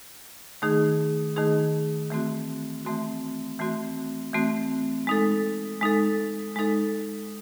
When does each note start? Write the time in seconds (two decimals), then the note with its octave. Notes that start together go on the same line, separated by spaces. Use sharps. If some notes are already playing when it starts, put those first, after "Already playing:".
0.62 D#3 A3 D#4 G#4
1.36 D#3 A3 D#4 G#4
2.10 E3 A3 C4 F#4
2.85 E3 A3 C4 F#4
3.59 E3 A3 C4 F#4
4.33 E3 A3 C4 F#4
5.07 G#3 D#4 A4
5.81 G#3 D#4 A4
6.56 G#3 D#4 A4